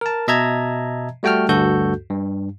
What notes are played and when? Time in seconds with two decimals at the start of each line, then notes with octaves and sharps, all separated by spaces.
0.01 A#4 A5
0.28 B2 D#5 E5 A5 A#5 G#6
1.23 G3 A3 F#4 G5 A5 F6
1.49 D2 G2 F#4 A4 G6
2.11 G2